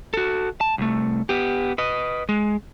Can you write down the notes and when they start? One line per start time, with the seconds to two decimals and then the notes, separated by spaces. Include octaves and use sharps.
0.14 F#4 A4
0.61 A5
0.78 C2 A3
1.29 B3 G4
1.78 B4 D#5
2.29 G#3